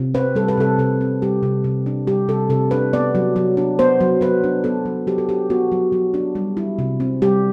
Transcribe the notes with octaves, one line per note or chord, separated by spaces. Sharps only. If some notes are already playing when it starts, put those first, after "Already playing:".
Already playing: C3
C4 B4
G3 A4
B4
C3 A4
C3 A4
C4
G3 G4
C3
C3
D4
G3 G4
C3 A4
C3 A4
D4 B4
B3 D5
F#3
F#3
D4
B3 C5
F#3
F#3 B4
D4
B3 A4
F#3
F#3 G4
A4
D4 G4
B3 F#4
F#3
F#3
D4
G3
E4
C3
C4
G3 G4